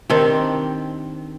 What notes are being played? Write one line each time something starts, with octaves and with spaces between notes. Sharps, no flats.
D#3 C4 D4 G4